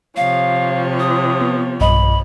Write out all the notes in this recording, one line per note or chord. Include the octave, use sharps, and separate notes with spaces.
C3 F3 C#5 F5
D#6
B3
B1 G2 D#5 B5